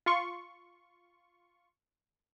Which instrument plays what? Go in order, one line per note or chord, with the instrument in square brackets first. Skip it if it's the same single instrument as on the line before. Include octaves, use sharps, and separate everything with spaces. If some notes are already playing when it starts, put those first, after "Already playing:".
[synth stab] F4 C6 C#6